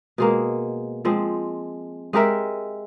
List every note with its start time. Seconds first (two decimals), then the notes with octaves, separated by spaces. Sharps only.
0.18 B2 G#3 A#3
1.05 F3 G#3 C4
2.13 G#3 G4 A#4 E5